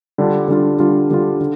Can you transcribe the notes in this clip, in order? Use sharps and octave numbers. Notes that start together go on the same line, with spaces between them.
D3 G3 D4 F4
D3 G3 D4 F4
D3 G3 D4 F4
D3 G3 D4 F4
D3